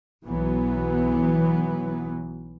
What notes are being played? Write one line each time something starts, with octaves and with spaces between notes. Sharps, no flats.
B1 E3 F#3 B3